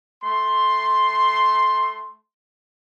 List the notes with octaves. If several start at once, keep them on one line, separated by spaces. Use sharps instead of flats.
A3 C6